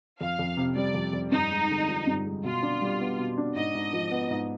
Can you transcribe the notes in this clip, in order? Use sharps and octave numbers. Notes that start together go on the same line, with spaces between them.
F2 F5
F2
C3
G3 D5
F2
F2
G2 D#4
G#3
D3
F3
G2
G#3
B2 F4
D4
G3
B3
B2
D4
G#2 D#5
G#2
F3
B3
G#2